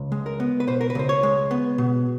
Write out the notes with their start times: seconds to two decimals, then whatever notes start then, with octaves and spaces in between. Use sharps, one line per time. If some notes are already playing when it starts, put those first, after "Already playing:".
Already playing: C#2
0.12 G#3
0.26 A#4
0.40 B3
0.60 B4
0.67 B2 C5
0.81 A#4
0.90 B4
0.95 C#2 C5
1.09 C#5
1.23 G#3
1.51 B3
1.78 B2